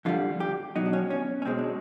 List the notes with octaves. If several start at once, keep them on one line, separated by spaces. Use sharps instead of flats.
F2 D3 G3 F4
G4
B2 F#3 D#4
D4
C#4
C#4
C#4
B2 G#3 C4
D4